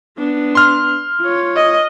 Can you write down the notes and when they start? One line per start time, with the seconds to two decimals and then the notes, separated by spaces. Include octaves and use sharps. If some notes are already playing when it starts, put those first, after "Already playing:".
0.18 B3 D4
0.55 C6 F6
1.21 F4 C#5
1.56 D#5